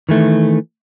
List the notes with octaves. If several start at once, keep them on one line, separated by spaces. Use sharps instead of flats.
D#3 E3 A3